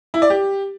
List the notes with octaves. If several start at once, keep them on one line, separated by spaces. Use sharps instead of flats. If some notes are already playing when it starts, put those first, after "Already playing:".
E4
D5
G4